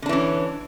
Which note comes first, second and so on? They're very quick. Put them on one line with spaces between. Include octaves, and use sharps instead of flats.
D3 D4 E3 C#4